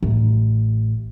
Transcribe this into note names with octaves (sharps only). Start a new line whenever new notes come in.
A1